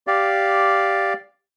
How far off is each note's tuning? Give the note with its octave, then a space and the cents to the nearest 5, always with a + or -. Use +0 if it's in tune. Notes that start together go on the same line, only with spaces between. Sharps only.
G4 +0 D5 +0 F5 +0